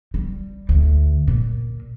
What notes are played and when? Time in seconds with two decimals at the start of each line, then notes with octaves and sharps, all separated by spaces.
0.14 G3
0.69 D2
1.28 A#2